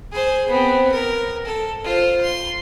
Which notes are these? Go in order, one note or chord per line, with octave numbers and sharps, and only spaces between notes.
G#4 C5
B3 C4
A#4
A4
F4 C5
C6